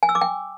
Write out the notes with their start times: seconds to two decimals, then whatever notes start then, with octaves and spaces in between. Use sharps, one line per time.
0.03 G#5
0.09 E6
0.15 D6
0.21 G5